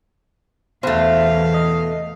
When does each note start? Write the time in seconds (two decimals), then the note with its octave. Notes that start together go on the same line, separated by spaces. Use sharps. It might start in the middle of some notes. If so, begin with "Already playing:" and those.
0.83 E2 B2 A3 C5 F5
1.54 D#5